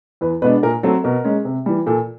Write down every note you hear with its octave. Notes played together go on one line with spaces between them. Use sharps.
E2 B4
B2 G#3 B3 D4 B4
A#2 A#4
F#3 A3 C4 A4
B2 A#4
G#3 C#4
C3
E3 G3
A#2 A4